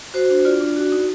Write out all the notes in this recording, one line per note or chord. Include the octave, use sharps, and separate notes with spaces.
F#4 C5
D4
F4 D5
D4
F#4
D#4